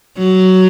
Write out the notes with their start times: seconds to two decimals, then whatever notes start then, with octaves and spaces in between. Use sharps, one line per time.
0.18 F#3